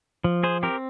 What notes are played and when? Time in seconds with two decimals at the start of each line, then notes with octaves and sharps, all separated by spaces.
0.24 F3
0.43 G#4 C5
0.63 C4 G4 A#4